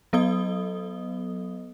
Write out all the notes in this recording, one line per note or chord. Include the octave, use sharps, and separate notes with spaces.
F#3 B3 A4 D#5 D#6 G7